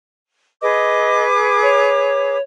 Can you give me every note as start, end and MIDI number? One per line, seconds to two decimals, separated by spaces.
0.61 2.38 68
0.61 2.38 71
0.61 1.23 75
0.61 2.38 86
1.62 2.40 73